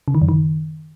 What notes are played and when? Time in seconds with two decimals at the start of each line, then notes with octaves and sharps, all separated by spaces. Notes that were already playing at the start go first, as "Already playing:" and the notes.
0.08 C#3
0.15 D#3
0.22 F#2
0.29 D#3